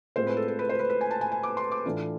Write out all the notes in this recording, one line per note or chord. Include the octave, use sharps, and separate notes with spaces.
A2 G#3 C4 F4 C5
B4
A4
A4
B4
C5
B4
B4
G#5
A5
G#5
G#5
D6
C6
D6
A2 E3 A3 D4 F4